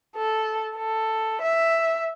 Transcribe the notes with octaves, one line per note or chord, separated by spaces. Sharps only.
A4
A4
E5